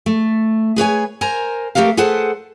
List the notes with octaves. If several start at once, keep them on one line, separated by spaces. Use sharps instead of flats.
A3
G#4 B4 C#5 G#5
A#4 C5 G#5 A#5
A3 G4 A4 A#4 F5
G#4 A4 B4 C5 F#5 A5